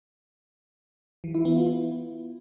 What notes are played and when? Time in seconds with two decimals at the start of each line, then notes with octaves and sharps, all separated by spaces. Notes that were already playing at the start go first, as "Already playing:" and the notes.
1.24 E3
1.35 E4
1.45 B3
1.56 F4
1.67 E4